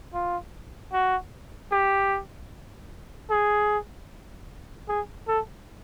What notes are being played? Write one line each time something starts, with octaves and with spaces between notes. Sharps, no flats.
F4
F#4
G4
G#4
G#4
A4